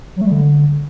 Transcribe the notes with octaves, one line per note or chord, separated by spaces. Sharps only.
F#3
A3
G3
D3